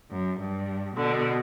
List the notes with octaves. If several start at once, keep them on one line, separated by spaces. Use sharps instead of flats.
F#2
G2
B2 D3